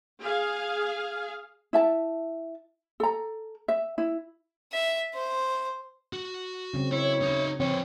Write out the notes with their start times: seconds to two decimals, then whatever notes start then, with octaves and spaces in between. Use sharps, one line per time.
0.22 G#4 F5
1.73 E4 E5 A5
3.00 A4 A#5
3.68 E5
3.98 E4
4.72 E5
5.14 C5
6.13 F#4
6.73 C#3 F#3 C4
6.92 E4 C#5
7.22 D#4 E5
7.60 F3 C4 B4 C#5